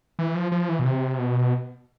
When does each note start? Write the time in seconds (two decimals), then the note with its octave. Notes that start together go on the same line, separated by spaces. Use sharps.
0.19 E3
0.35 F3
0.52 F3
0.69 E3
0.79 B2
0.85 C3
1.19 B2